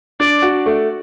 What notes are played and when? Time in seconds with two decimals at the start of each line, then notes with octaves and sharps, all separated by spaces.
0.20 D4 D5
0.42 F#4
0.66 A3